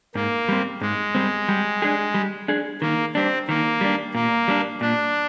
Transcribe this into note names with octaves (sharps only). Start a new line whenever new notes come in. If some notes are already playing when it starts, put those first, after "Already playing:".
G#2 A#3
G3 C4
G#2 G#3
G3 C4
G3
D4 G#4
G3
D4 G#4
D#3 A#3
G3 C4 D4
D#3 A#3
G3 D4
A#2 A#3
G3 D4
A#2 D4